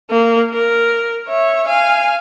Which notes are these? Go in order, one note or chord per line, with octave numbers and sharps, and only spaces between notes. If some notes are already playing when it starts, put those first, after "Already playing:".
A#3
A#4
C#5 E5
F5 G#5